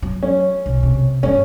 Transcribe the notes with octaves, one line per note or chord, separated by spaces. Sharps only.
F#3
C#4
B1
C3
E2 G2 C#4